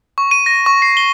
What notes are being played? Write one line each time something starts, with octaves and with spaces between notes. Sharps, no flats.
C#6
D#7
A#6
C#6
C7
G7